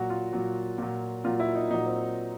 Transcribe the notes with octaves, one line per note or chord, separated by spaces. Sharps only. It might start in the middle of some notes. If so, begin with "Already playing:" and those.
Already playing: A#2 F#3 F#4
F4
A#2 F#3
A#2 F#3
A#2 F#3 F4
E4
D#4
A#2 F#3 D#4
C4